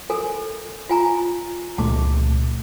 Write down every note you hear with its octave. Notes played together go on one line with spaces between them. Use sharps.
A4 A#4 G#5
F4 G#5 A#5
C#2 A#2 A3 A5 D6